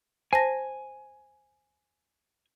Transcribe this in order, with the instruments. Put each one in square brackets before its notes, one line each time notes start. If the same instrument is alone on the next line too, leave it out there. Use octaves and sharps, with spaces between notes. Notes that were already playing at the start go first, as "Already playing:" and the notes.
[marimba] C5 A5 A#6 [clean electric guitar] G#5